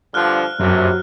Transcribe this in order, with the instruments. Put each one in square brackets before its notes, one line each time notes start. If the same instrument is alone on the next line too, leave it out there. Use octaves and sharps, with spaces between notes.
[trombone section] G2 D3 F3 [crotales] F6 F#6
[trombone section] A#1 C3 [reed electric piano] F#2 [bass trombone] F#3